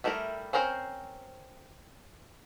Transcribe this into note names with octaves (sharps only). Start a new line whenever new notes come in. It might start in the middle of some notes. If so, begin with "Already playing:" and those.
G3 A3 E4 F#4 A#4
C4 C#4 A#4 C5 C#5